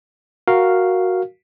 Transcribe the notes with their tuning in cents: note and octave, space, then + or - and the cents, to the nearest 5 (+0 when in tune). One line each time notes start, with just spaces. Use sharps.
F#4 +0 A#4 +0 F5 +0